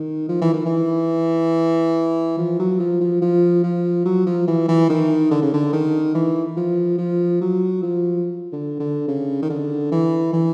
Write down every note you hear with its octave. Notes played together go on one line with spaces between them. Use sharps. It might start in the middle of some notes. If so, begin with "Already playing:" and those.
Already playing: D#3
F3
E3
D#3
E3
F3
F#3
F3
F3
F3
F3
F#3
F3
E3
E3
D#3
D3
C#3
D3
D#3
E3
F3
F3
F#3
F3
D3
D3
C#3
D#3
D3
E3
E3